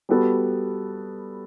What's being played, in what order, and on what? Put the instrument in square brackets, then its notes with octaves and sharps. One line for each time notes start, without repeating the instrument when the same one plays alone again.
[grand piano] G3 B3 F#4 A4